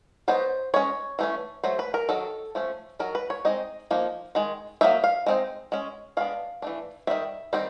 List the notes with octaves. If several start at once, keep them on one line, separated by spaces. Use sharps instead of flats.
F#3 B3 D#4 C5
G#3 C#4 C#5
E3 A3 C#4
F#3 A3 C5
B4
A#4
D#3 F#3 A4
F3 A3 C#4
D#3 F#3 A#4
B4
C#5
G#3 C4 D#4 D#5
F3 A#3 D#4
D#3 G#3
F#3 A#3 D#4 E5
F5
G#3 C4 D#4
G#3 C#4
G#3 B3 D4 F5
E3 A3 D4
D#3 G3 C4 E5
D#3 G3 C4 D#4